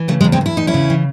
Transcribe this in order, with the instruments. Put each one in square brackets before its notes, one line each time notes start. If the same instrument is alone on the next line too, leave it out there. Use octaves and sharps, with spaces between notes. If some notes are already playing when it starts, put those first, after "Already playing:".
Already playing: [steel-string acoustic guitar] E3
C#3 A3
G#3
E2
G#3 C4
E2 E4
E2 D#4
C#4 E4
C#3
E3